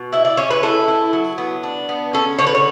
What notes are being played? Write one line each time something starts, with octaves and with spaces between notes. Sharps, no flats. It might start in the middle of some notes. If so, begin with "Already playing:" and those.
Already playing: B2
E4 E5
D5
C#4 C#5
B4
E4 A4
E4
F#3
B3
D4
B3
C#4 A4
D3 C#5
B4
C#5